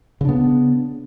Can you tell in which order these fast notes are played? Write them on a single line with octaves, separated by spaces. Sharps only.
C#3 D4 B3